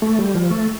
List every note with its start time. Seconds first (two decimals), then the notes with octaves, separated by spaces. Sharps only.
0.02 A3
0.19 G3
0.35 F3
0.51 A3